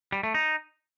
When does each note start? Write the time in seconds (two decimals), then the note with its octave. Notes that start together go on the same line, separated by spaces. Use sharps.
0.12 G3
0.23 A3
0.34 D#4